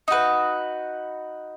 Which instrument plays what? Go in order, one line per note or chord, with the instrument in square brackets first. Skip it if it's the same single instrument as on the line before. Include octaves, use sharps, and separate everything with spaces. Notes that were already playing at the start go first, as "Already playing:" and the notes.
[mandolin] D#4 F#4 B4